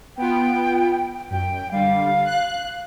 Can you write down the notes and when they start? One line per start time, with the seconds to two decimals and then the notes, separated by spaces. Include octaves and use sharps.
0.17 B3 F4 G5
1.30 F#2 G5
1.72 D3 G3 F5
2.24 F#6